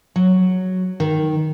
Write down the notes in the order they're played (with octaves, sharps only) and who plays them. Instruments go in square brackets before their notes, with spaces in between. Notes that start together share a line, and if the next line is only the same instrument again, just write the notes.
[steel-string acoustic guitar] F#3
D#3